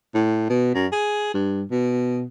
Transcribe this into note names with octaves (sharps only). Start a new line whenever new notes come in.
A2
B2
F#2
G#4
G2
B2